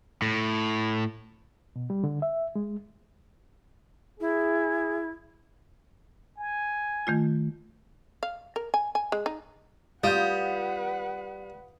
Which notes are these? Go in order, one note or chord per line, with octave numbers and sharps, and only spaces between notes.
A2
B2
G3
D3
E5
G#3
E4 G#4
G#5
D#3 A3 F4
F5
A#4
G#5
G#5
G#3
D#4
G3 F4 B4 F#5 D#6 G6